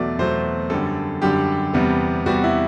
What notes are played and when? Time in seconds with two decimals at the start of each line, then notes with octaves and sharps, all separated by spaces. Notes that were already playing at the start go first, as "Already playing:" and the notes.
Already playing: E2 B2 F#3 A3 D5
0.19 E2 B2 F#3 A3 C5
0.70 F#2 D3 G3 A4
1.22 F#2 D3 G3 G4
1.74 E2 C3 G3 B3
2.26 E2 C3 G3 B3 F#4
2.44 E4